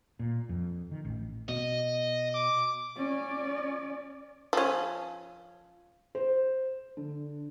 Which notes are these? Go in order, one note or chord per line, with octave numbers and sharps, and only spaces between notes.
A#2
F2
D#3
A1
B2 D#5
D6
C#4 D5
F3 C#4
C5
D3